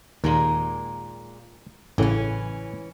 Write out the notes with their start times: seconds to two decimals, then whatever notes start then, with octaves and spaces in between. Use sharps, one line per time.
0.24 D#2 A#2 G#3 A#4
1.98 A1 A2 C#3 E3 C#4